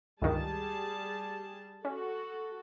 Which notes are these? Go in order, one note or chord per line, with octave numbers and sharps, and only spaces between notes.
C#2 G2 D#3 G3 G#4 A5
C#4 F#4 A4